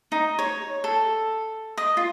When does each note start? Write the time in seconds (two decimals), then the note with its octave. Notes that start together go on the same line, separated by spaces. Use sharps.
0.12 D#4
0.39 C#5
0.84 A4
1.77 D#5
1.97 F4